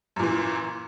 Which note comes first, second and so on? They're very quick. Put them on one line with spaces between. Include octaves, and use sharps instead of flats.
F#2 A#2 E3